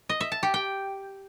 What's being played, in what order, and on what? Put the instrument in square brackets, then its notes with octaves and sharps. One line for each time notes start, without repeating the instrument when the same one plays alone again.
[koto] D#5
E5
A5
G4
G5